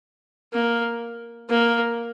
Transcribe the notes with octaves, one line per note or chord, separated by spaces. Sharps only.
A#3
A#3